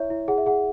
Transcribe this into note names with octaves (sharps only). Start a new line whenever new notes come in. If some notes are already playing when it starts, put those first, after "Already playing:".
Already playing: E4 C#5 E5
E4
G#4 F#5
E5
G#4 F#5